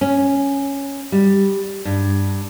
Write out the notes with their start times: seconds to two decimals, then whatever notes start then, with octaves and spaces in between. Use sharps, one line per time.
0.01 C#4
1.12 G3
1.85 G2